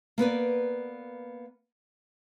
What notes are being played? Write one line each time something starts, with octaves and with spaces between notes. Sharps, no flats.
A#3 B3 B4 D5